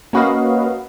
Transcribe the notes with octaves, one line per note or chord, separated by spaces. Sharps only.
A#3 C#4 F#4 B4 D#5 F5